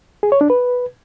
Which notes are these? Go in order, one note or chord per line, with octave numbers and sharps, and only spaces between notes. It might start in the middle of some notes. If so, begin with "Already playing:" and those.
G#4
C#5
D4
B4